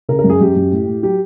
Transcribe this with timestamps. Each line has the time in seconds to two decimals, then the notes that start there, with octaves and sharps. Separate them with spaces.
0.09 C#3 A#4
0.19 A#4
0.24 F#2
0.30 G#4
0.41 F#2 G4
0.56 F#2
0.71 A2
0.87 A2
1.03 F#3 G4